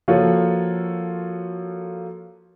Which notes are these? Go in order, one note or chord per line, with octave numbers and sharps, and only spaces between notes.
F3 A#3 F4 F#4 A4 C#5